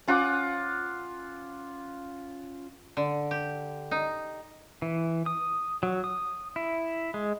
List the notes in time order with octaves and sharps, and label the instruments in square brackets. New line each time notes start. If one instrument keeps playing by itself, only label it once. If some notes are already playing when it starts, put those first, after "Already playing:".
[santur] C#4 F4 F#5 D6
[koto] D3
G4
D#4
[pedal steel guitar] E3
D#6
F#3
D#6
E4
G#3